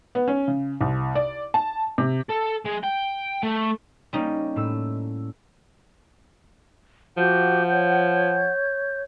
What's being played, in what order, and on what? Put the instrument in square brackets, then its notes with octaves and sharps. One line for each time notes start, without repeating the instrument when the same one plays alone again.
[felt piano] B3
C#4
C#3
C2
D5
A5
C3
[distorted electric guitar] A4
G#3
G5
A3
[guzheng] G3 D#4 [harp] A#3 C#4 G4
[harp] A2 A3 E6
[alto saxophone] F3 [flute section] F#4 G4 G6 [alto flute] F#5
[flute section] C#5 G6